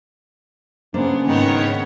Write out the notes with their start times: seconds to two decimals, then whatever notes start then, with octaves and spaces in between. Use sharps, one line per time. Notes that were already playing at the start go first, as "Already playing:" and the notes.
0.94 C#3 A#3 B3 D4 G#4 C5
1.27 G#2 D#3 B3 C#5